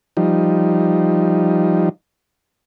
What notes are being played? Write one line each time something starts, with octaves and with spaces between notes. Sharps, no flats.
F3 G3 D#4